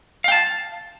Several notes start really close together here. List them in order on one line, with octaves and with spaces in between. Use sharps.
F5 G5 A5